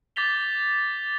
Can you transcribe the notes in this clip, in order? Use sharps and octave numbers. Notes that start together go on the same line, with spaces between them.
D6 G6 A6 B6 F7 G7